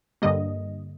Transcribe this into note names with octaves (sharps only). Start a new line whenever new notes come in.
G2 D3 G3 A#3 D#5